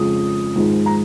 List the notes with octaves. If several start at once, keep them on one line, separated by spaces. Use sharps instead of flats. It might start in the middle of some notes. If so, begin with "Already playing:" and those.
Already playing: F2 C#3 G#3 D#6
G#1 G#2 F3 G#3
A#5